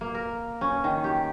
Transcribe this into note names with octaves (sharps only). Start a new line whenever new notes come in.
A#3
A#4
C#4
D#3
G4